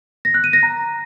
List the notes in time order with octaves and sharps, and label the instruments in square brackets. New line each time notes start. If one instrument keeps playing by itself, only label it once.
[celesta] A#6
F#6
D#7
A#6
A#5